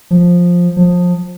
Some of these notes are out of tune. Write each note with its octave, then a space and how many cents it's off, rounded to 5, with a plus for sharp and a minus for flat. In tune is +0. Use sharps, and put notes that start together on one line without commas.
F3 +10
F3 +25